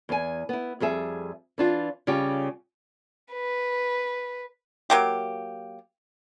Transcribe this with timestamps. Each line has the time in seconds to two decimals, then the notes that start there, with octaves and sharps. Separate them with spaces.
0.09 E2 G#5
0.49 B3 E4
0.80 F2 G3 G#4 E5
1.58 E3 D4 F4
2.07 C#3 G3 F4 G4
3.33 B4
4.90 F#3 A#3 G4